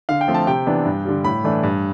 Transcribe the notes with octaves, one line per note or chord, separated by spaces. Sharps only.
D3 F5
G5
F3 A3 C4
A5
C3 G5
E3 B3 D4
G2
D3 G3
A2 B5
E3 A3 D4
G2